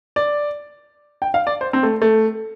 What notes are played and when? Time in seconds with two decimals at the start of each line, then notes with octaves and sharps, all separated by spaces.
0.16 D5
1.22 G5
1.34 F5
1.47 D5
1.61 C5
1.73 C4
1.83 A3
2.02 A3